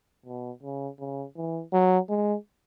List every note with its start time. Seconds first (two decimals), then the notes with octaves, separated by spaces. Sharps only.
0.26 B2
0.63 C#3
0.99 C#3
1.36 E3
1.73 F#3
2.09 G#3